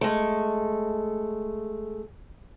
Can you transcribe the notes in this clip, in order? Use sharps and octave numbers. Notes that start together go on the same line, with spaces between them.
G#3 A3